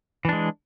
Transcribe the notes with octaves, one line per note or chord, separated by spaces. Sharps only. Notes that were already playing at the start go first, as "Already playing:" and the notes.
E3 G#3 D4